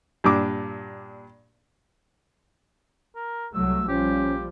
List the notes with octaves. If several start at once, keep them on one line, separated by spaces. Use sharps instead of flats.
G2 A#2 D4 D6
A#4
C2 F#3 A3 E6
A#1 F3 G3 C#4 G4